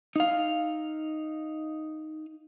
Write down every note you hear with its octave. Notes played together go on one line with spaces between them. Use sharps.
D#4 F5